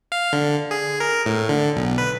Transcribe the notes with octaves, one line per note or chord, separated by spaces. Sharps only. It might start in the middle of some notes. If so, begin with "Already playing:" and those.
F5
D3
G#4
A#4
A2
D3
B1
B4